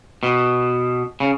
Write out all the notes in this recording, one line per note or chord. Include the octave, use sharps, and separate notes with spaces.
B2
C#3